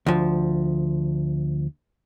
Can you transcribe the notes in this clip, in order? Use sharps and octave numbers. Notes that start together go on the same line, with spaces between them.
D2 F3